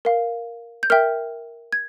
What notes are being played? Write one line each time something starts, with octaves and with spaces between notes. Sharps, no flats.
A#4 F5
G6
A#4 E5 G5 F6
G#6